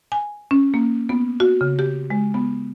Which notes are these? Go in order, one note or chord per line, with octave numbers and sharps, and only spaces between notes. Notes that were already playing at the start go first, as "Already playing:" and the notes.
G#5
C#4
A#3
B3
F#4
C#3
G4
G#3
B3